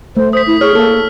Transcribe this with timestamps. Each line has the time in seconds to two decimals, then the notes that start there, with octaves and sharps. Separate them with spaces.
0.17 A3 C5
0.33 C5 D#6 B6
0.47 E4
0.61 G#4 C#5 F6
0.75 A#3 A4